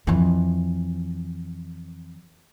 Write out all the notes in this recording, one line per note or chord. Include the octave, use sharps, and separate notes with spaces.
F2 E3